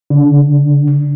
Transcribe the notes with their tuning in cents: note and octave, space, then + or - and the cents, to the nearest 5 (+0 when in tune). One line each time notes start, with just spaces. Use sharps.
D3 -30 D4 +5